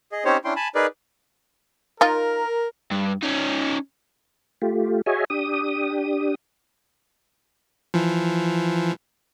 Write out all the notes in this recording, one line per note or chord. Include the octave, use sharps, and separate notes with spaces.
G#4 D#5
C4 C#4 D#4 G4 C5 C#5
C#4 D4 E4 G5 C6
G#5 A5 B5
D#4 G#4 A#4 B4 D5
D#4 F4 A#4
G2
C#4 D#4
A3 F4 G4
F#4 G#4 C#5 D#5 E5 G#5
D4 G4 D#6
E3 F3